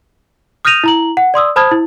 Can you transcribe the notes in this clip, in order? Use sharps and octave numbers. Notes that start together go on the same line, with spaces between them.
D#6 F6 G6 A#6 D#7 F7
E4 A#5 F#7
F#5
D5 C6 D#6 E6
C5 A5 B5 D#6 F6 G#6
E4